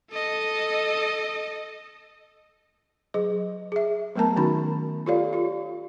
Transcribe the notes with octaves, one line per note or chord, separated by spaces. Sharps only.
A4 D#5
F#3 G#4 D#5
G#4 E5
F#3 A3 B3 A#4 A5 A#5
D#3 C#4 D#4 F#4 B5
F4 G4 A4 C#5 D5 F5
F4 G4